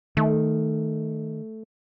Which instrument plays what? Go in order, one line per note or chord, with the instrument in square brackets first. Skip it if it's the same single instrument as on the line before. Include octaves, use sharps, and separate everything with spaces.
[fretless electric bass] D#3 [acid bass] A3